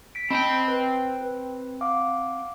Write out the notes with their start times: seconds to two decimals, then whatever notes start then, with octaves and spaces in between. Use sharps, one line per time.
0.15 B6 D7
0.30 C4 D#5 G5 A5 B5
0.68 B4
1.21 B4
1.81 F5 F#5 D6